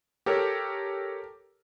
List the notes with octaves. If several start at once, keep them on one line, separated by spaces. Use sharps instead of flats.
G4 A4 A#4 C#5